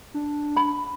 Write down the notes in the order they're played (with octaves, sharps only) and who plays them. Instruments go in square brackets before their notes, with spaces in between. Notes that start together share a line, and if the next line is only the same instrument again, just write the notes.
[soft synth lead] D4
[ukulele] B5